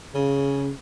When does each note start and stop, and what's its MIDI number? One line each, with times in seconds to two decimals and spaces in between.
0.15 0.69 49